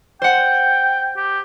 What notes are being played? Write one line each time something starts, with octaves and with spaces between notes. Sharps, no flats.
C5 F#5 G5
G4